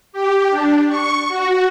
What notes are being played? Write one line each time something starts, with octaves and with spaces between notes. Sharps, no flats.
G4
D4
C#6
F#4